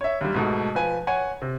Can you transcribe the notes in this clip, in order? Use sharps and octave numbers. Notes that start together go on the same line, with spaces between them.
C#5 E5
D#2 G3
G#2 B2 A3
F3 B4 G#5
C#5 F#5 G#5
C3